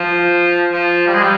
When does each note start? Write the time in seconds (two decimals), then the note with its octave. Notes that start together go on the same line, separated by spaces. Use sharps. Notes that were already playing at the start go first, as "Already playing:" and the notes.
Already playing: F3
0.72 F3
1.07 G3
1.14 G#3
1.22 G3